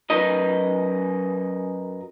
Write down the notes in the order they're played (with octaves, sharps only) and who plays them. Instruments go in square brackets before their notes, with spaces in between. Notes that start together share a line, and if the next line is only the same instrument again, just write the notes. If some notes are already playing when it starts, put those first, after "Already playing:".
[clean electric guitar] F#2 A#4 B4 D#5